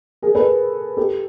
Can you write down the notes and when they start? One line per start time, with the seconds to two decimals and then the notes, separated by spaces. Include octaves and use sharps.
0.22 G#4 A#4
0.35 A4 B4
0.97 G4 A4